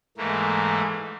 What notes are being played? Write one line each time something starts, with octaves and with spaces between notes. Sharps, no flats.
G#2 E3 A3 A#3